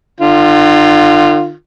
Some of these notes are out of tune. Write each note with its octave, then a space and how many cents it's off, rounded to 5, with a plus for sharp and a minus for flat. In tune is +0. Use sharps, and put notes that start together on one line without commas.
D3 +45 F4 -5